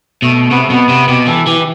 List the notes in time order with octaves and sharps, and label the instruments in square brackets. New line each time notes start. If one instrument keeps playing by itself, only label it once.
[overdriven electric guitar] B2 [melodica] A3
[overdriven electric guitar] C3 [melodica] B3
[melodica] A3
[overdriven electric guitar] B2 [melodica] B3
[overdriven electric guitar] C3
[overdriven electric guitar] B2 [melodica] G4
[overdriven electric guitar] E3 [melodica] A4
[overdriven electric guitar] E3 [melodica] G4